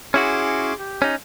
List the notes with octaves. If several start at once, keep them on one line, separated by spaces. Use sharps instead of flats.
C#4 E4 F#4 G#4 C6 D6
G4
C#4 D#4